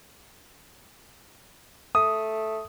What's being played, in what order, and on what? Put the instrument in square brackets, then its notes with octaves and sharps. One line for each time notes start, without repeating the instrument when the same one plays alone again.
[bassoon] A3 [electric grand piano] D#6